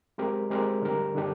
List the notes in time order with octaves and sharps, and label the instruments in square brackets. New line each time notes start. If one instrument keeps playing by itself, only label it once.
[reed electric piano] G#3 C4 G4 A#4
G#3 C4 G4 A#4
D3 G3 D4 G4 A#4
D3 G3 D4 G4